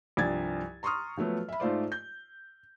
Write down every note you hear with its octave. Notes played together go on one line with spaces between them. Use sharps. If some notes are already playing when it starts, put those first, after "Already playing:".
C2 G2 F3 G#5 G#6 A6
A#5 C6 C#6 D#6 F6
F3 F#3 A3 B3
E5 B5
G#2 A3 F4 C5 D5
G6